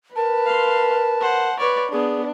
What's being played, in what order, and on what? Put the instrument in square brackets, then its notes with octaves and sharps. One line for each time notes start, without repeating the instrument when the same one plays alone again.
[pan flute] A#4 [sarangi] B4 [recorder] A5
[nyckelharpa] F5 C6
C5 F#5
[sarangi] B4 [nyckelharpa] C#5 D5
[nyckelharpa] B3 [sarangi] D4 [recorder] G#4